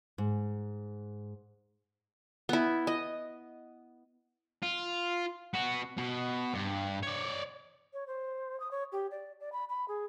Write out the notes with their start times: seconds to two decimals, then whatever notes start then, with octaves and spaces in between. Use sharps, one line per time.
0.18 G#2
2.49 B3 E4
2.87 D#5
4.63 F4
5.54 B3 F#4
5.97 B2
6.54 G2
7.03 C#5 D5
7.93 C#5
8.07 C5
8.60 D#6
8.71 C#5
8.92 G4
9.11 D5
9.40 D5
9.52 B5
9.69 B5
9.88 G#4